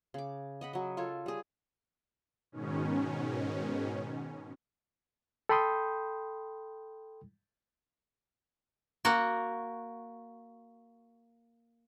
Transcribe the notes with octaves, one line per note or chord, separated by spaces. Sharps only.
C#3 D6
D#5 F#5 B5
F#3 D#5
F4 A4 C#5
G3 G#4
G#2 B2 D#3 C#4
A4 G5 B5 C6 D#6 G6
A#3 F#4